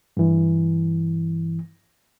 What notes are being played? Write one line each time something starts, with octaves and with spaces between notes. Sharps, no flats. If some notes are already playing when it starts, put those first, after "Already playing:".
G2 E3